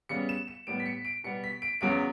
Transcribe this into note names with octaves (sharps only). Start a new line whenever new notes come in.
C#3 G3 B3 C#7
E7
E7
A2 G3 B3 D7
B6
C#7
D7
B2 G3 B3 C#7
B6
D7
E2 C#3 F#3 B3 D7